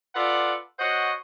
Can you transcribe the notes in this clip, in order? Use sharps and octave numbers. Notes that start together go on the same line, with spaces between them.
F4 A4 B4 D5 F#5
F#4 C5 C#5 D#5 F#5